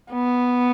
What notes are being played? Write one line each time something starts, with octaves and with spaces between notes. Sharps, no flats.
B3